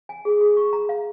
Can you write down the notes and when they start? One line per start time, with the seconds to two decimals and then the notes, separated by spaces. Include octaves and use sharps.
0.09 G#5
0.25 G#4
0.41 G#4
0.57 C#6
0.73 A#5
0.89 F5